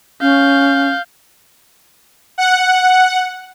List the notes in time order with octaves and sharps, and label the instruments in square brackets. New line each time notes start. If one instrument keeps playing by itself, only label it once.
[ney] C#4 [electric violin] F5 G6
[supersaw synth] F#5